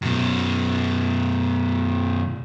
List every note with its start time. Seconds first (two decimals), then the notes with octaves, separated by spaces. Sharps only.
0.03 F#2 B2